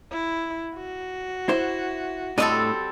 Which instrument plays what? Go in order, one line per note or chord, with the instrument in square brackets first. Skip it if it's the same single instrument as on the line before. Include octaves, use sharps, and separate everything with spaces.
[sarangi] E4
F#4
[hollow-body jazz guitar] E4 C5
[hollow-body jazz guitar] A2 D4 D#5 [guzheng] G3 C4 A4